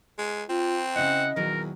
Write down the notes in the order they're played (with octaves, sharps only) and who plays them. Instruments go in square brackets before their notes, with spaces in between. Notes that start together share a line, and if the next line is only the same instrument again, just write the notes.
[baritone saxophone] G#3
[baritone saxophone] C4 [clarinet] F4
[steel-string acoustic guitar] C#3 E4 [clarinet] D#5 [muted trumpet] F#5
[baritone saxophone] E2 [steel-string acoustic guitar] A#2 D#3 F#3 [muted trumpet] A#4